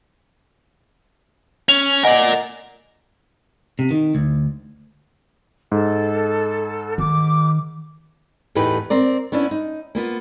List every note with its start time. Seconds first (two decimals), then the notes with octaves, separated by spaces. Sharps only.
1.69 C#4 F7
2.03 A#4 D5 D#5 F#5 G#5
3.79 C3
3.91 D#3
4.15 D2
5.72 G#2 A4
6.98 D#3 D6
8.55 E2 A2 A3 D#4 G4 B4
8.90 C4 A#4 D5
9.32 B3 C#4 D4 E4
9.51 D#4
9.95 A#3 B3 F4